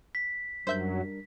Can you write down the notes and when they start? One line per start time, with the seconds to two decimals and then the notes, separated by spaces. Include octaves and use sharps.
0.15 B6
0.67 F#2 F#3 G3 D4 A#4 C5 E5 G6